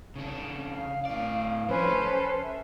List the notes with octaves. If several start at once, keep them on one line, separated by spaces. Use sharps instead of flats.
C#3 D4
F5
A2 D5 F5
F3 C#4 E4 B4 C5
A4
E5